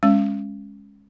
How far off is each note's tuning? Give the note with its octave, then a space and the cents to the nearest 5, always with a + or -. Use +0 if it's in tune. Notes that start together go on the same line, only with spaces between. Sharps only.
G#3 -10 C#4 -5